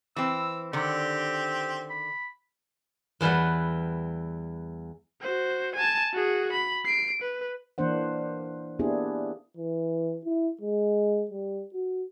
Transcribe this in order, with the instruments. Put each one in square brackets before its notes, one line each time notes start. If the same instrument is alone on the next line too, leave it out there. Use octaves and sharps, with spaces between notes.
[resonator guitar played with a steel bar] E3 C4 [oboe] E6
[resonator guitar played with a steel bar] D3 D#3 [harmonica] C4 [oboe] G4
[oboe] B5
[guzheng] E2 E3 G3 B4 F#5
[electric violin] F#4 C5
G#5 A5
F#4 G#4
B5
C7 D7
B4
[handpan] E3 A#3 D4 C5 F#5
A#3 B3 D4 E4 G4 G#4
[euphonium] E3
E4
G#3
G3
F#4